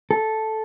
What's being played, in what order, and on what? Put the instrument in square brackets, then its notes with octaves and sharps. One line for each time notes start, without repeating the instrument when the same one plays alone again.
[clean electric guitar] A4